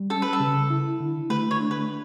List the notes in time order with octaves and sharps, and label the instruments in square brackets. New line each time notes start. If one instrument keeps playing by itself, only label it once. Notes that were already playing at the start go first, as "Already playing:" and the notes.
Already playing: [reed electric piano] G3
[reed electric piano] C#4 [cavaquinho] A4
[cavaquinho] B4
A4
[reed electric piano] C#3
E4
D3
[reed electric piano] A3 [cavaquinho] B4
[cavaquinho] C#5
[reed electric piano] D4
[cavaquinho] B4